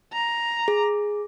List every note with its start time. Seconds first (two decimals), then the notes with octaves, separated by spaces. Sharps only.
0.13 A#5
0.68 G#4